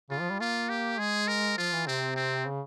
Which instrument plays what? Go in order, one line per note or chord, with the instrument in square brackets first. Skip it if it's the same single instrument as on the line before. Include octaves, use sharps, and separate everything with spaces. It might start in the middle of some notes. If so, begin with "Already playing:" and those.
[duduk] C#3 [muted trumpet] F4
[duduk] F3
G3
[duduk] A#3 [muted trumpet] F4
[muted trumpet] G4
[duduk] G#3 [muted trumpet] G#4
[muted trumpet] A#4
[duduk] F3 [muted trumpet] F4
[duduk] E3
[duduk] C3 [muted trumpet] C4
[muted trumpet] C4
[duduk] C#3